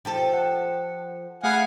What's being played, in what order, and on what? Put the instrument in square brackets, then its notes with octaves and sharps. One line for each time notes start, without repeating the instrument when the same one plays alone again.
[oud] F3 G4 A4
[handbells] F#5
[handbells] A3 G#4 B5 [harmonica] F5 F#5 G#5